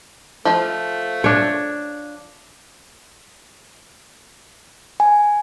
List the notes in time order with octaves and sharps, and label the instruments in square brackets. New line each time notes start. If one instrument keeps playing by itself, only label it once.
[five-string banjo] F3 F4 [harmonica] A3
[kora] D4 C#5
[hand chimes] G#5